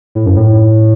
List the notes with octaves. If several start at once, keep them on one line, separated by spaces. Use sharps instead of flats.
A2
F#2
A2